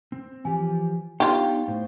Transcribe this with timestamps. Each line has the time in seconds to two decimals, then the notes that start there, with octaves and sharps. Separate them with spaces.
0.12 C4
0.45 E3 F3 G4 G#5
1.20 B3 D4 D#4 F4 G4 F5 C#6
1.68 A2 C5